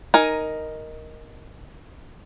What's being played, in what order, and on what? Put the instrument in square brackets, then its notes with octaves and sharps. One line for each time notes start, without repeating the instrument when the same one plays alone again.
[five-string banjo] D#4 A#4 G#5